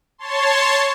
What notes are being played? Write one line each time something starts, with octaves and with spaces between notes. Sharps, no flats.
C#5 A5 C6